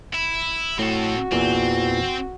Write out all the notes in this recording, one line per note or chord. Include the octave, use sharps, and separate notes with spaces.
E4
A2 C4 F#4 A4
E2 A#2 E3 C4